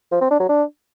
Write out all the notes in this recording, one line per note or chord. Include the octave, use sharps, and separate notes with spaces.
F3
C4
D4
F#3
D4